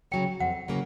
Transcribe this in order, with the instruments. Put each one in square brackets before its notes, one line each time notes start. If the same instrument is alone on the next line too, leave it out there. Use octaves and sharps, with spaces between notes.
[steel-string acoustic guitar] C#3 F#3 A#3 [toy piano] G5
[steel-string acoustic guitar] F2 [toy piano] F#5
[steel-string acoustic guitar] C#3 F#3 A#3